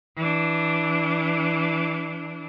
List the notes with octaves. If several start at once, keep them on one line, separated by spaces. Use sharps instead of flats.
E3 D4